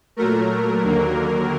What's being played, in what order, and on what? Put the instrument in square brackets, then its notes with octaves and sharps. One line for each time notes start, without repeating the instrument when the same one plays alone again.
[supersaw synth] A#2 F#3 A3 A#4
D#2 D3 F#3 A#3